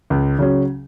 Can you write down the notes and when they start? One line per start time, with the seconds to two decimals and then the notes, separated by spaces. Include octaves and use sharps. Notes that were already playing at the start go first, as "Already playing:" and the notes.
0.10 C#2
0.39 C#3 F#3 C#4